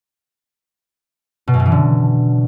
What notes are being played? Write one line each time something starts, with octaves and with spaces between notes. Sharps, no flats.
B2
F#2
B2
E3
D3